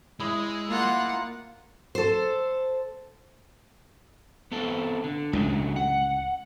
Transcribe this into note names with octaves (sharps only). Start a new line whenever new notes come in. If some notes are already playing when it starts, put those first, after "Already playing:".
G#3 E4 D#5
A#3 F4 F#5
A4 C5
B3 C4 A4
D3
C#2 A2 D3 F#3 G#3
F#5